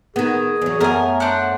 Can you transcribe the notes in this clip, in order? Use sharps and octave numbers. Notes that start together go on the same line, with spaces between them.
D#3 B3 G#4
E2 F#3
F#2 A3 B3 A#4 G#5
D4 C5 F#5